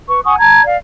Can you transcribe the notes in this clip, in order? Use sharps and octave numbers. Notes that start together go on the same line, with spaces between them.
B4 C#6
F#5 G#5 C#6 D#6
A5 A#5 G#6
D5 F5